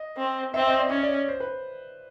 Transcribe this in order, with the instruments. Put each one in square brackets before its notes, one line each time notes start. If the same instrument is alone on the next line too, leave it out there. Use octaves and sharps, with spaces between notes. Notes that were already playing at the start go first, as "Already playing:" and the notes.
Already playing: [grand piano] D#5
[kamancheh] C4
[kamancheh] C4 [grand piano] E5
[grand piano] D#5
D5
[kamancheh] C#4 [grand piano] C#5
[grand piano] D5
C5
B4